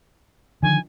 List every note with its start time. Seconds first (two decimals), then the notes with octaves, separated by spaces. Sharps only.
0.63 D3 D#3 F3 G#5